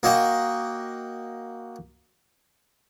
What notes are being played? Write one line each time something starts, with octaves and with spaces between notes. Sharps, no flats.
A#3 F#4 D#5 G5